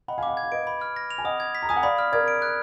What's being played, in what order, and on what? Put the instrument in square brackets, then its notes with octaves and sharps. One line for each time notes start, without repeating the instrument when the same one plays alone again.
[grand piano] D#5 F#5 [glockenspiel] B5
[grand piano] F5 G#5
[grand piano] D#5 F#5 [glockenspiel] D6
[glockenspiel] G#6
[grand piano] F5
[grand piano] B4 D#5 [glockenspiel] D7
[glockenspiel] B5
F6
A#6
F7
[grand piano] G#5
[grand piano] D#5 F#5 [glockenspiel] D#6
[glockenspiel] G#6
B6
[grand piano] A#5
[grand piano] G#5 [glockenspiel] D#6
[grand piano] F#5
[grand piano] D5 F5 [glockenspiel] B5
[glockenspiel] F6
[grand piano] A#4 D5 [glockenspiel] G#6
[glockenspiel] D7
F#6